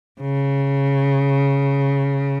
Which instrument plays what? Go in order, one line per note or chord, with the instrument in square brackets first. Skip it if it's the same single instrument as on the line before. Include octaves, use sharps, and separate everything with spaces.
[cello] C#3